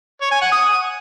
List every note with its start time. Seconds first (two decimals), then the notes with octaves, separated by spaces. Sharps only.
0.21 C#5
0.31 G#5
0.41 F#5
0.52 D#6